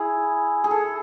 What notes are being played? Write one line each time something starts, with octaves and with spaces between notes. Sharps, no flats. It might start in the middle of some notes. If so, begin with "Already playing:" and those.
Already playing: E4 G#4
G#4
A4